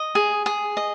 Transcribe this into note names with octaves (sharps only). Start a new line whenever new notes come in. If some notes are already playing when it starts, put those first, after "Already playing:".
Already playing: D#5
G#4
G#4
D#5